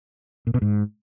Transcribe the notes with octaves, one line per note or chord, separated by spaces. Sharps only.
A#2
B2
G#2